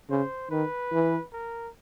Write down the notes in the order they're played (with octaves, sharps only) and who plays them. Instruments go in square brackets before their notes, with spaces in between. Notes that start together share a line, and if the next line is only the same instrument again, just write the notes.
[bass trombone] C#3 [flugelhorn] C5
[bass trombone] D#3 [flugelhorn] B4
[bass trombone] E3
[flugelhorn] A#4